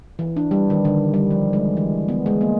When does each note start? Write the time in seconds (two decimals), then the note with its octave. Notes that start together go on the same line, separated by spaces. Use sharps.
0.19 E3
0.36 D4
0.51 G3
0.70 D#3
0.85 D3
1.14 G3
1.31 F3
1.53 G#3
1.77 E3
2.08 B3
2.26 G#3
2.41 A#3